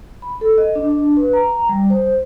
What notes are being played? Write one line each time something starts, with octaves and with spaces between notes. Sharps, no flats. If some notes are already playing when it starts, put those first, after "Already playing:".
B5
A4
D#5
D4
B4
A#5
G3
C5